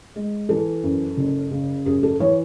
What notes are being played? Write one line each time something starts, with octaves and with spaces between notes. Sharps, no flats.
G#3
E3 A4
F#2
F#1
C#3
F#2 G#4
A4
E3 C#5